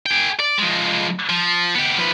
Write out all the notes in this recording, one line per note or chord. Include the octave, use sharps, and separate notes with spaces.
G#4 G5
D5
F3 G#3
F3
B3 G4
F3 B4